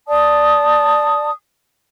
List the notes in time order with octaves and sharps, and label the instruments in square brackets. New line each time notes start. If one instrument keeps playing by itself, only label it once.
[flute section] D5 A5 D#6